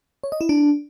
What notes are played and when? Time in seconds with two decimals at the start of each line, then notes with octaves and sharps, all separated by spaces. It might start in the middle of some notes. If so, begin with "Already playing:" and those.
0.24 C#5
0.32 D#5
0.41 E4
0.49 D4